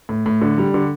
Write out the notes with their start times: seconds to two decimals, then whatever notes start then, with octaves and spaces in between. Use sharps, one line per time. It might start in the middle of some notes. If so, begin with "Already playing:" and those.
0.09 A2
0.26 A2
0.41 D3
0.58 G3
0.74 D3